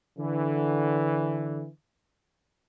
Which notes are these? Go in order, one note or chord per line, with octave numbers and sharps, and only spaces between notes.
D3 E3